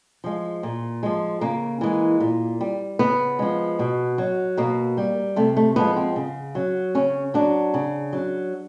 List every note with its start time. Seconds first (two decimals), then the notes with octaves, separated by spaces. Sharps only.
0.24 F3 G#3
0.63 A#2
1.03 F3 G#3
1.41 C#3 A#3
1.81 E3 G#3
2.20 A#2
2.61 G3
2.99 C#3 B3
3.39 F3 G#3
3.79 B2
4.18 F#3
4.57 B2 A#3
4.97 G3
5.36 C3 A3
5.57 A3
5.76 F3 G#3 B3
5.96 C4
6.16 C#3
6.55 F#3
6.95 C#3 C#4
7.34 F#3 D4
7.74 C#3
8.13 F#3